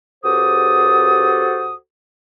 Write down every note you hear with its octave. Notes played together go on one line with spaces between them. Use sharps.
C#2 F#4 G4 A4 C5 D#6